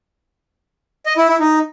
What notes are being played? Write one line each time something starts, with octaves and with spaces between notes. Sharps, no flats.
D#5
E4
E4
D#4